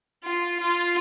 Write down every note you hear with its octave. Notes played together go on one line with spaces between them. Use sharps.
F4
F4